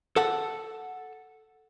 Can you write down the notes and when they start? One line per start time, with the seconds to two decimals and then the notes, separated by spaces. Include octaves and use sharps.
0.16 A4 F#5